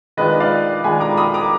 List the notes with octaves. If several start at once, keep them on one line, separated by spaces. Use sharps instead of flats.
D#3 G#3 D4 F4 B4 D#5
D5 F5
D#3 G#3 D4 F4 G#5 B5
A#5 D6
B5 D#6
A#5 D6